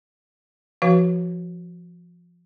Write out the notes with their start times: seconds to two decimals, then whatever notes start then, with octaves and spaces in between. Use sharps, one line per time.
0.82 F3 F#4 B4 F5